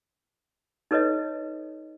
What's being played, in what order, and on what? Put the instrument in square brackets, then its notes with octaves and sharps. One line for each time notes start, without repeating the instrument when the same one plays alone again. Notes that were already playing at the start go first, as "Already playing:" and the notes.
[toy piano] D#4 A4 B4 C#5 D#5